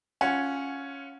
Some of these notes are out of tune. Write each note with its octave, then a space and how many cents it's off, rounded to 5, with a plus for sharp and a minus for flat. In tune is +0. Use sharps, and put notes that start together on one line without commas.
C#4 +0 F4 +0 F#5 -10